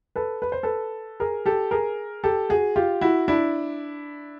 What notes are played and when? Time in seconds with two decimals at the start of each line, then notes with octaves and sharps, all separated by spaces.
0.16 A4 B4
0.42 B4
0.52 C5
0.63 A4 B4
1.20 G#4 A#4
1.46 G4 A4
1.71 G#4 A#4
2.24 G4 A4
2.49 F#4 G#4
2.76 F4 G4
3.01 E4 F#4
3.28 D4 E4